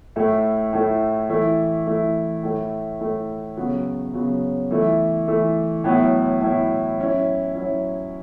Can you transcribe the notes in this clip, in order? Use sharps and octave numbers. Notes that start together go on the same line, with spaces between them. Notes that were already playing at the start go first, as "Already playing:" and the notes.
A2 A3 E4
A2 A3 E4
E3 A3 E4
E3 A3 E4
A2 A3 E4
A2 A3 E4
C#3 F#3 B3 F#4
C#3 F#3 B3 F#4
E3 A3 E4
E3 A3 E4
A2 F#3 B3 E4
A2 F#3 B3 E4
F#3 C#4 E4
F#3 C#4 E4